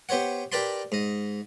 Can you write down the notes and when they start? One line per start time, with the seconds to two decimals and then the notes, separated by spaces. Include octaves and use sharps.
0.09 B3 G4 C5 C#5 F#5
0.52 G4 A#4 B4 D5 A5 C6
0.92 G#2 D#5